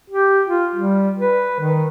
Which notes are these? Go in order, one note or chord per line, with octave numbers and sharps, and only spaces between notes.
G4
F4
G3
B4
D#3